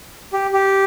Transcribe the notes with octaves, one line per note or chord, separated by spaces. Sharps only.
G4
G4